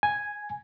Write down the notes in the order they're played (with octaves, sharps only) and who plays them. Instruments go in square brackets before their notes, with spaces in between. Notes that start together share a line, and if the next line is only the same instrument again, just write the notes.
[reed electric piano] G#5